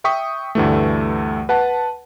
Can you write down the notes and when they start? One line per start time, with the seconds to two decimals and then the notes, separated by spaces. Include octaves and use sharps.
0.04 E5 G5 C#6 D#6 B6
0.55 D2 G2 E3 A3
1.49 B4 F#5 A5